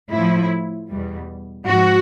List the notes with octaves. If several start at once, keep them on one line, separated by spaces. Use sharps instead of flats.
A2 E4
F3
E2 B2 G3
G#2 F3 F#4